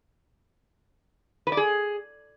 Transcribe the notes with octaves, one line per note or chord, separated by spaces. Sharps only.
B4
D5
G#4